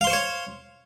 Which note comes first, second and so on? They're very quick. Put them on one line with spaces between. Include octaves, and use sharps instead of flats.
F5 C6 C5 C#6 C#5